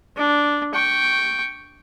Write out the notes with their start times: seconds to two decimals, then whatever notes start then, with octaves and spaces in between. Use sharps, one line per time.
0.17 D4
0.74 G5 C#6